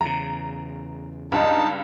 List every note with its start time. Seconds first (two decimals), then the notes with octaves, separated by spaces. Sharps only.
0.01 E2 C#3 A#5
1.32 C#2 G2 D#4 A5